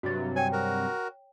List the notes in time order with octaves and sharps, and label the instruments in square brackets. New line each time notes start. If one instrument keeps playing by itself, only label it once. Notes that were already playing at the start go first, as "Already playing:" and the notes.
[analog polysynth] G2 C3 F#3 [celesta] F#4 A6
[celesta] C#5 G5 [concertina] G#5
[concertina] F#4 A#4